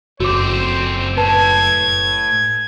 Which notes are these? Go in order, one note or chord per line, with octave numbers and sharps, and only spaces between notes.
F#1 A3 C4 F#4 C5 D6
A2 B4 A5 G#6